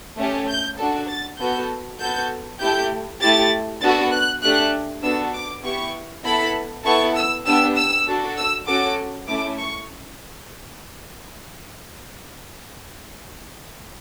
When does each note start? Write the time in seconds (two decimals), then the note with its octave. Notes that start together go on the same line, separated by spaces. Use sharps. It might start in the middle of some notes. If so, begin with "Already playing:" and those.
0.18 A3 C#4 G4
0.48 G6
0.79 D4 F#4 A4
1.08 A6
1.38 B3 F#4 A4 G6
1.99 B3 F#4 A4 G6
2.60 A3 E4 G4 G6
3.21 A3 E4 G4 A6
3.81 B3 D4 F#4 A4 A6
4.12 F#6
4.42 A3 D4 G4 F#6
5.03 B3 D4 F#4 A4 E6
5.34 D6
5.63 B3 E4 G4 C#6
6.24 B3 E4 A4 B5
6.84 B3 E4 A4 C#6
7.15 E6
7.45 B3 D4 G4 E6
7.75 E6
8.07 D4 F#4 A4
8.37 E6
8.67 C#4 F#4 A4 D6
9.27 A3 C#4 E4 D6
9.58 C#6